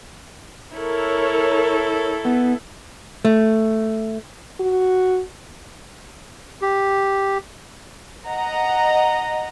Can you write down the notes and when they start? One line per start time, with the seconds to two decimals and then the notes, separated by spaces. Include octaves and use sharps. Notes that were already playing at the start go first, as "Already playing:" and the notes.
0.75 E4 A4 A#4 C#5
2.25 B3
3.25 A3
4.60 F#4
6.62 G4
8.27 D#5 F#5 A#5